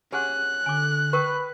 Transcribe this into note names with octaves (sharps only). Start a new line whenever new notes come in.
C#4 G4 G#4 F#5 F#6
D3 G#5 D6
A#4 B4 G5 C#6